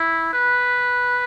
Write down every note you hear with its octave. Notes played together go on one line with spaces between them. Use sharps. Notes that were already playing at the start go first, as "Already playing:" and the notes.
Already playing: E4
B4